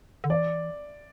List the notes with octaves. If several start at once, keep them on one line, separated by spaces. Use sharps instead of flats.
D3
E3 D5